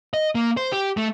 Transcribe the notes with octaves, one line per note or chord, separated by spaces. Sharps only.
D#5
A#3
C5
G4
A3